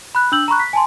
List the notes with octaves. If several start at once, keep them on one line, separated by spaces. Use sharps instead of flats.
B5 F#6
D4 E6 G6 F#7
A#5 B5 C#6 F#6
B6
G#5 A5 C6